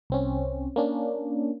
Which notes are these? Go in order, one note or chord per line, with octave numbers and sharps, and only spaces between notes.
C2 C4 C#4
A#3 C#4 D4